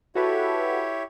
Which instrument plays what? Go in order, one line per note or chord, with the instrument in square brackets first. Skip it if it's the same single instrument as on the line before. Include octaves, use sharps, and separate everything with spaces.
[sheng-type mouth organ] E4 G4 C#5 [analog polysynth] F#4 A4 B4